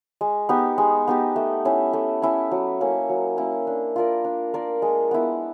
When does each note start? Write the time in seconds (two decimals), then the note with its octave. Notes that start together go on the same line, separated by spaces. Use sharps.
0.21 G#3
0.49 B3 D#4 G4
0.78 G#3
1.07 B3 D#4 G4
1.36 A3
1.65 C#4 E4
1.93 A3
2.22 C#4 E4
2.51 F#3
2.81 A#3 C#4 E4
3.09 F#3
3.37 A#3 C#4 E4
3.67 D4
3.96 F4 A#4 D5
4.24 D4
4.54 F4 A#4 D5
4.82 G#3
5.11 B3 E4